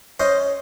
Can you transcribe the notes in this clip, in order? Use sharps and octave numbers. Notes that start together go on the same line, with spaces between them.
C#4 C5 D#5